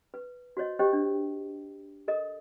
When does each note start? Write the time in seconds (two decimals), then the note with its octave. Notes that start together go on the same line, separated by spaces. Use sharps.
0.14 B4
0.57 F#4 C5 C#5 D#5
0.79 G4 C5 C#5 D#5 G5
0.93 D4
2.08 A4 A#4 D#5